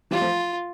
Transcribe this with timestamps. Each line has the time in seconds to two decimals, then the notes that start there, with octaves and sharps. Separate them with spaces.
0.11 E3 G3 F4
0.21 F3 A3